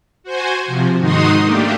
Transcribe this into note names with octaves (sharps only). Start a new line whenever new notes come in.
F#4 C5 G#5
C3 F3
G#2 D#3 D#4 F#4 C6 D#6
A3 A#3 D4 G4